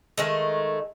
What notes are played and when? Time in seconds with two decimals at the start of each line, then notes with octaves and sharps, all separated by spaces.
0.18 D#3 G#3 A3